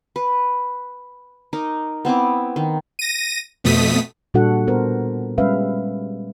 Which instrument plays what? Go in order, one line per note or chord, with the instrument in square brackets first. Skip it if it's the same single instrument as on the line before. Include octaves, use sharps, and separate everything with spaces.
[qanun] B4
D#4 A#4 D6
B3 C4 E4 D6
D#3
[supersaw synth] A#6 D#7
F2 B2 A3 D#6 B6
[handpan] A#2 G3 D4 F#4 A4 F#5
B3 A#4 C5
G3 G#3 C#4 B4 E5 F5